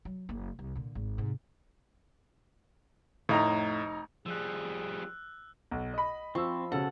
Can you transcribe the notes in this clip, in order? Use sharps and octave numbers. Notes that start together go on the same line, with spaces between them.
F#3
F#1 A#3
C2
A#2 D3
G#1
G#2 C3
F1 A2 D#4 A#5
F3 G3 G#4 E6 F#6
B1
D#5 B5
F3 C4 C#6 E6
B1 C#3 A4 F#5